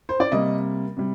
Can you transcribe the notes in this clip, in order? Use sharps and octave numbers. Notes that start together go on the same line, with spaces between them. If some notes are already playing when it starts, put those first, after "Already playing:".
C5
D5
C3 G3 A#3 D#5
C3 G3